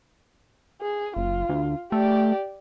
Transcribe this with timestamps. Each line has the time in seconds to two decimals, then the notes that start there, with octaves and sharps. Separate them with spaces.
0.81 G#4
1.17 F#1 F4
1.49 D2
1.92 A3 G4 D5